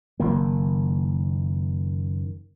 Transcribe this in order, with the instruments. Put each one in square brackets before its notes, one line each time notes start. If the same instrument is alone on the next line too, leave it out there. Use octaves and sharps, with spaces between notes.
[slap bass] F#1 D#3 A#3